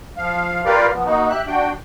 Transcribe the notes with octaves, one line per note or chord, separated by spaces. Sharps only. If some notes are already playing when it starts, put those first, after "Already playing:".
F3 F5
F4 G4 A#4 B4 D5 F5
F3 B3
A#3 D#4 F#4
G4 E5 F#6
D4 F#4 G5